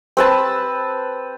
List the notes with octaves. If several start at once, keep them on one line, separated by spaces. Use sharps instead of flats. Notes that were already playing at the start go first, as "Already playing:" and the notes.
C4 B4 A5